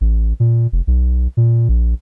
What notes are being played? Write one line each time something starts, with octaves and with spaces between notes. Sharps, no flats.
A1
A#2
F1
B1
A#2
A#1